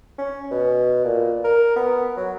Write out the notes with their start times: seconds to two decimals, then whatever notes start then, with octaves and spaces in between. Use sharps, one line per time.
0.18 C#4
0.51 B2
1.04 A#2
1.44 A#4
1.76 B3
2.17 F#3